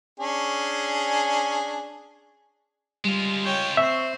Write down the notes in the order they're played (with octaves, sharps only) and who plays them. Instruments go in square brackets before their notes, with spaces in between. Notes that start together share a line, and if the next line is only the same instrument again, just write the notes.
[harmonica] C#4 D4 G#4
[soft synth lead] G3 [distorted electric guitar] G#3 F4
[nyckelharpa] C#5 G5
[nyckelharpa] C4 C5 [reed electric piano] E5 [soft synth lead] C#6